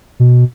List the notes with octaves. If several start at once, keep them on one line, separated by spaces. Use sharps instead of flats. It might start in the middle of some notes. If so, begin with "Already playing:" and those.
B2